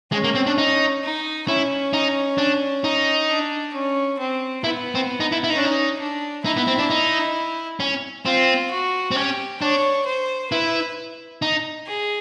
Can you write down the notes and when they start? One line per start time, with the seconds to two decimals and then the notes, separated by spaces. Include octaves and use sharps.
0.12 G#3 C#4
0.24 A#3
0.35 C4
0.46 D4
0.58 D#4
1.03 D#4
1.48 C#4 E4
1.93 D#4
2.38 D4
2.84 D#4
3.29 D4
3.74 C#4
4.19 C4
4.64 B3 E4
4.95 C4
5.20 D#4
5.32 E4
5.44 E4
5.50 D#4
5.54 C#4 D4
5.65 D#4
5.99 D4
6.45 D#4 E4
6.57 B3
6.67 C4
6.79 D4
6.90 D#4
7.80 C#4
8.26 C4 F4
8.71 F#4
9.11 C4
9.16 C#4 G4
9.61 D4 C#5
10.06 C5
10.51 E4 B4
11.42 D#4
11.87 G#4